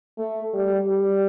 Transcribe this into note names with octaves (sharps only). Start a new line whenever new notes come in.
A3
G3
G3